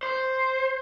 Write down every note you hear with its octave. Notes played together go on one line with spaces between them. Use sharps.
C5